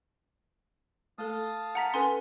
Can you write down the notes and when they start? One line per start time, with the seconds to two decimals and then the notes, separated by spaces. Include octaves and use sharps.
1.18 A3 A4 F5 A5 D#6
1.75 F#5 A#5 B6
1.94 C#4 A4 B4 G#5 C6